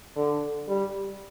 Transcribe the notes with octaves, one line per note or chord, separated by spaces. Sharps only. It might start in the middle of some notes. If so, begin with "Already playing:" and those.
D3
G3